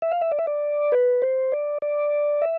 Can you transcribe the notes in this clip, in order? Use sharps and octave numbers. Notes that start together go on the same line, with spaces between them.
E5
F5
E5
D5
E5
D5
B4
C5
D5
D5
E5